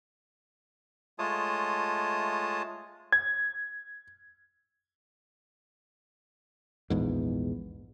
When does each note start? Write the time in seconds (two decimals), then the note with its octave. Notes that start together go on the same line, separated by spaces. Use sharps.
1.19 G#3 A3 F4 C#5 A5 D#6
3.12 G#6
6.90 A#1 E2 G#2